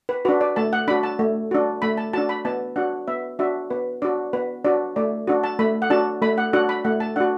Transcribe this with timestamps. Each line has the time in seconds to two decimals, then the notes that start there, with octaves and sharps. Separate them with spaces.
0.09 B4
0.25 D4 F#4 B4
0.41 D5
0.56 A3 A5
0.73 F#5
0.88 D4 B5
0.91 F#4
1.03 A5
1.19 A3
1.51 D4 F#4
1.82 A3 B5
1.98 A5
2.13 D4 F#4 A5
2.29 B5
2.45 B3 A5
2.76 D4 F#4 F#5
3.08 B3 E5
3.39 D4 F#4 E5
3.70 B3 B4
4.02 D4 F#4 D5
4.33 B3 B4
4.65 D4 F#4 D5
4.96 A3 D5
5.27 D4 F#4
5.44 A5
5.59 A3 B5
5.82 F#5
5.90 D4 F#4 A5
6.22 A3 B5
6.38 F#5
6.53 D4 F#4 F#5
6.69 B5
6.85 A3 F#5
7.00 A5
7.16 D4 F#4 F#5